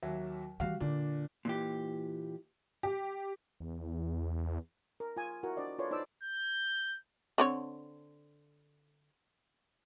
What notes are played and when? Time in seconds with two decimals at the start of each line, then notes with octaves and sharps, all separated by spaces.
0.03 D#2 F#3 E5
0.60 E3 G3 F#4 G4 F5
0.80 A#2 D3 D4
1.45 A#2 E3 G4
2.83 G4
3.60 E2
5.00 A#4
5.16 F4 G#5
5.43 E4 F#4 A#4 F#5
5.57 D4 C5 D5 D#5
5.79 F4 A4 B4 C#5 D5 C6
5.91 D#4 C5 D5 A5 D6 E6
6.23 G6
7.38 D3 C4 C#5